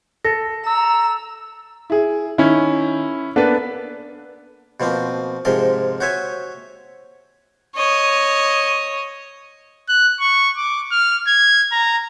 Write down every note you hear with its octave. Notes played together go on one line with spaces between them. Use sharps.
A4 A#6
A#5 E6
E4 G#4
D#3 C#4 E4
A#3 B3 D4 A4 B4
B2 F3 A#3 C4
G#2 C3 F3 A#4 C6
F#4 C5 C#5 E5 G#5
C#5 D#5
F#6
C#6
D6
F6
G#6
A#5